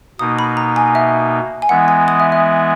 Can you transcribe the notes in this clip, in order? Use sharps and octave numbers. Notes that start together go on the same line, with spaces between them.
B2 A#3 D#4 D#6
B5
A#5
G#5
E5
G#5
E3 G#3 B3 E4 F#5
G#5
D#6
E5
E5